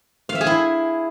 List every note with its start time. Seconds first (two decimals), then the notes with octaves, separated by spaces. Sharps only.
0.29 F5
0.35 E5
0.41 G#4
0.47 E4